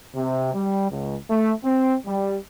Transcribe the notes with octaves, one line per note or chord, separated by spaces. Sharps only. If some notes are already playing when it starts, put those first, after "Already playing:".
C3
G3
C#2
A3
C4
G3